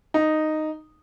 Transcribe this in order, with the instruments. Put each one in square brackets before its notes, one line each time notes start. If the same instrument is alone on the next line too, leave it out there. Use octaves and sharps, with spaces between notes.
[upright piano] D#4